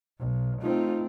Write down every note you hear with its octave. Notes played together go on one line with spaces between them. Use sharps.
B1
A3 C4 D#4 F4